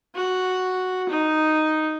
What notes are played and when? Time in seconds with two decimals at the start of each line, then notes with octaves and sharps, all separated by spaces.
0.16 F#4
1.09 D#4